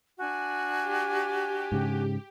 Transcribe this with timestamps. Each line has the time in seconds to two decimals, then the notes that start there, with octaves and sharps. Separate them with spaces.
0.19 D4 F#4 G#5
0.79 G4
1.72 G#2 C#3